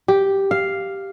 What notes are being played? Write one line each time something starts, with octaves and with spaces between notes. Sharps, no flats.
G4
F5